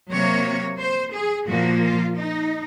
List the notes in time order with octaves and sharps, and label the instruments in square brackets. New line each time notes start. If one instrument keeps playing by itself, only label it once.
[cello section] C3 F#3 A#3 C#5
C5
G#4
A#2 F3 A#3 F#4
F4
D#4